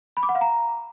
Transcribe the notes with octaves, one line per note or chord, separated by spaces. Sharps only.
B5
D6
F#5
F5
A#5